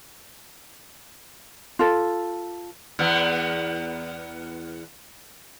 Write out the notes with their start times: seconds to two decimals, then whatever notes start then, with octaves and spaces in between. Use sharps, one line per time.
1.79 F4 A4
2.99 E2 B3